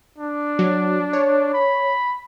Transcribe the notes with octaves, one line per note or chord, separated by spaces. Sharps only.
D4
F#3
C#5
B5